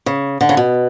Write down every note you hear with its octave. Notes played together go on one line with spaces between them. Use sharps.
C#3
D3
C#3
B2